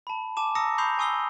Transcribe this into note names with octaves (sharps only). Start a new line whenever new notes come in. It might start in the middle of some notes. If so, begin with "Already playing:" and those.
A5 B5
G#5 A5 D6 E7
A5 A#5 D#6 E6 A#6 C#7
B5 C#6 D#6 G6 C7 F7
G#5 C#6 D#6 E6 C7 G7